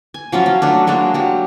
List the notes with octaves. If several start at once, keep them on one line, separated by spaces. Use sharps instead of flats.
G#5
F3 F#3 C#4 F4
F#3
F#3 A3 D4
F#3 G#3 A#3 D4
F#3 G4